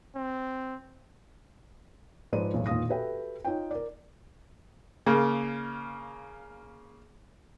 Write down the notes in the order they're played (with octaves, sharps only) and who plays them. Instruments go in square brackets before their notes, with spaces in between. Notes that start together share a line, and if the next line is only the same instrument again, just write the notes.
[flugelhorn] C4
[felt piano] G#2 F3 B4 C#5 D5 D#7
B1 E2 A2
E1 A#2 D#3 F5 D#6 A#6
F#4 G4 A4 B4 E5 G5
D#4 F4 C#5 G5
A#4 D5
[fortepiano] C#3 A#3